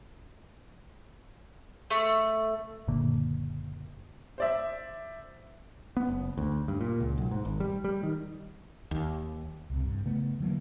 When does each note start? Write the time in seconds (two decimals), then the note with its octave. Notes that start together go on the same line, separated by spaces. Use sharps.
1.91 A3
2.88 F#1 A#2 D3 A#3
4.38 C5 D5 E5
5.97 B3
6.09 F#1
6.38 D2
6.68 G2
6.81 A#2
7.00 C#2
7.18 B1
7.31 G#2
7.45 G#1
7.60 G3
7.84 G3
8.03 D#3
8.91 D#2
9.70 C2 C3
9.83 G2
10.05 C#3 A3 B3
10.40 D3 E3 F#3 A#3